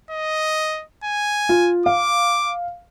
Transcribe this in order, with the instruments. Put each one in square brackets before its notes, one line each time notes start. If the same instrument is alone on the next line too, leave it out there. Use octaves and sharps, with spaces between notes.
[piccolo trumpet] D#5
G#5
[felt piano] F4
[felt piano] F5 [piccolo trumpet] D6